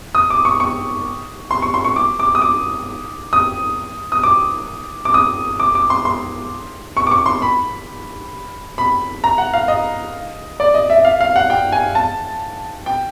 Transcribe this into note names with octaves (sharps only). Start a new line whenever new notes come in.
D#6
D6
C#6
C#6
C6
C#6
C6
C#6
D6
D6
D#6
D6
D#6
D#6
D6
D6
D#6
D6
D6
C6
C6
C#6
D6
C#6
C6
B5
B5
A#5
F#5
F5
D#5
D5
D#5
E5
F5
F5
F#5
G5
G#5
A5
G5